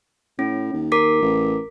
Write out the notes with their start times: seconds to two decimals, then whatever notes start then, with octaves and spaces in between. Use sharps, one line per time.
0.39 A2 C#4
0.73 D#2
0.92 A#4 D6 B6
1.22 A1